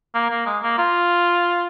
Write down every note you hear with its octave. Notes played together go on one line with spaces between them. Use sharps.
A#3
A#3
G#3
A#3
F4